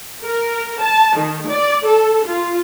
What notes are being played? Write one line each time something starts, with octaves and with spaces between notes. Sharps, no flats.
A#4
A5
D#3
D5
A4
F4